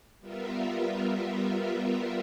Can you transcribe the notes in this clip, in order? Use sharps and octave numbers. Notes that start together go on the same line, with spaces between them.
G3 B3 F4 A#4 E5